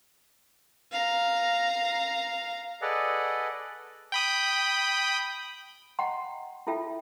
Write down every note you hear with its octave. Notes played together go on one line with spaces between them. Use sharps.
F5 A#5
G#4 A4 B4 D5 D#5 F#5
G5 B5 D#6
D#5 F#5 G5 A#5 C6
E4 F4 A4 E5 G5